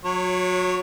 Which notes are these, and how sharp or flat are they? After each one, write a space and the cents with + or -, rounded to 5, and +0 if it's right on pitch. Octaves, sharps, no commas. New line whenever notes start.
F#3 -30 C#5 +0